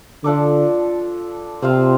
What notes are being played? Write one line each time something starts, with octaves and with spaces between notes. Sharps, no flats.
D3 F3 D4 A4 D5
C3 C4 F4 C5 F5